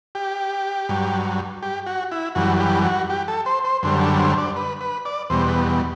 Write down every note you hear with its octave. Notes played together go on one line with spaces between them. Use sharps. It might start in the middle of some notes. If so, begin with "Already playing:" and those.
G4
G2 F#3
G4
F#4
E4
F#2 E3 G3 F#4
G4
F#4
G4
A4
C5
C5
F#2 D3 G3 C5
A4
C5
D5
B4
B4
D5
E2 B2 G3 C5
B4